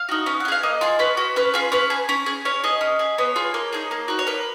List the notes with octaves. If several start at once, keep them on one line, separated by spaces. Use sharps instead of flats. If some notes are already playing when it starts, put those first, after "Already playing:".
Already playing: F5
D#4 F#4
C#4
F4 F#5
G#4 F5
A#3 D#5
F4 G#4
C#4 B4
F#4
C#4 B4
F4 G#4
C#4 B4
G#4
C#4
G#4
C#4 C#5
G#4 D#5
C#4
G#4
B3 C#5
F4 G#4
A#3
D#4 G#4
A#3
D#4 F#4
C#5
A#3 B4